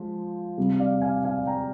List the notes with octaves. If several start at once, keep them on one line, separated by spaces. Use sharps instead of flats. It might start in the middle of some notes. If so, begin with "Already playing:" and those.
Already playing: F3 G#3
C3 G3
D5 F5
F5 G#5
F5 G#5
G5 A#5